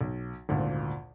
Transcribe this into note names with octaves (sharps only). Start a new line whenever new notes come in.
B1
G#1 D2 A#2